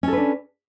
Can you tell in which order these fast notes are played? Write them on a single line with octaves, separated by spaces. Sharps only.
C#4 A4 B4 D4